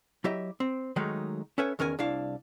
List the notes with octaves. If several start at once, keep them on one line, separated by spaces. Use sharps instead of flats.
F#3 E4 G4 D#5 E5
C4
D#3 F#3 G#3 A3 D#4
C#4 A4 B4 C#5 E5 G#5
E2 D#3 C#4 A#4 G#5
C2 D4 E4 F5